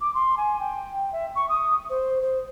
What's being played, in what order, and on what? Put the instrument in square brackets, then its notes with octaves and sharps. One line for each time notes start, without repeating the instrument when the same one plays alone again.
[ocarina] D6
C6
G#5
G5
E5
C#6
D#6
C5
C5